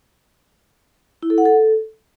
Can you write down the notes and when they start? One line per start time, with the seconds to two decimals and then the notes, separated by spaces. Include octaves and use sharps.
1.23 E4
1.30 A4
1.38 F#5
1.45 A4